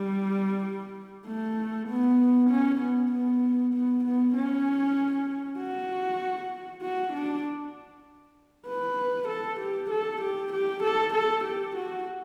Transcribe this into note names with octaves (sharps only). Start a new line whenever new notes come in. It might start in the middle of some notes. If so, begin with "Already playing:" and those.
Already playing: G3
A3
B3
C#4
B3
B3
B3
B3
C#4
F#4
F#4
D4
B4
A4
G4
A4
G4
G4
A4
A4
G4
F#4